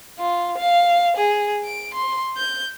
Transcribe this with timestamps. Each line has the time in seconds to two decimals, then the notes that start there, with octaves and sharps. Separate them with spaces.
0.19 F4
0.58 F5
1.17 G#4
1.64 D7
1.94 C6
2.37 G6